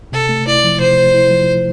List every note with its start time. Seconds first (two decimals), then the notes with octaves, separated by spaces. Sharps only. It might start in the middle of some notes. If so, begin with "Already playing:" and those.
0.12 C3 A4
0.29 A3
0.47 E4 D5
0.64 F3
0.80 C3 C5
0.98 A3
1.14 E4
1.31 F3